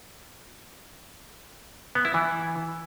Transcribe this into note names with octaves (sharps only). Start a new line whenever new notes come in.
B3
E4
E3